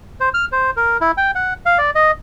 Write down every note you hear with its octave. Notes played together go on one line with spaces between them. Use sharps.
C5
F6
C5
A#4
E4
G5
F#5
F5
D5
D#5